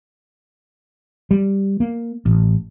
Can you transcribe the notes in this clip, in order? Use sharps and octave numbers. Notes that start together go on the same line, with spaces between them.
G3
A#3
A1